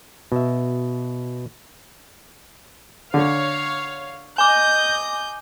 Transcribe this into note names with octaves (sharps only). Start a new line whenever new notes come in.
B2 E5
D3 C#5 F5
D#5 G#5 D6 G6